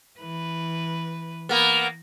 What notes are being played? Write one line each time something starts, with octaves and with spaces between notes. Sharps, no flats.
E3 B4
A#3 B3